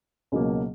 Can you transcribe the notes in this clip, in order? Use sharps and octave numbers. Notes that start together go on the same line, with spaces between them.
C#2 B2 F#3 A#3